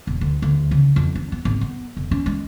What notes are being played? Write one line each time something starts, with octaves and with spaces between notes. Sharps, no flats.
E1
D2
D2
C#3
F2
D4
B3
G#1
B3
F1
C#4
G#3